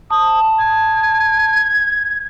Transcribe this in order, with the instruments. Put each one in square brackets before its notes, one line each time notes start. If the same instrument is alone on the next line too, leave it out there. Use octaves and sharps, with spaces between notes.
[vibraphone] A5 [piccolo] D#6
[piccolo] G#6